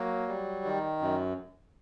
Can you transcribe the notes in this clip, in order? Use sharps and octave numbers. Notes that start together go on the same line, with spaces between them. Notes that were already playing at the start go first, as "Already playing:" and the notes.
Already playing: F#3 A#3
G3
D#3
F#2